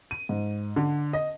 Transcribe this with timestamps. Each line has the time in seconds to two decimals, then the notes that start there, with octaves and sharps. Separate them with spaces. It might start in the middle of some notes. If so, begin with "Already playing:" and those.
0.11 D#7
0.29 G#2
0.76 D3
1.13 D#5